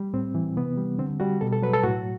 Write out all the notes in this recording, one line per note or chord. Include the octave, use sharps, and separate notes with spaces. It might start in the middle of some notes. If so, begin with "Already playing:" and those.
Already playing: G3
A2 C4
E3
C3 B3
G3
D3 C4
G3 F#4
B2 A4
A4
F#3 B4
A4
A2 F#4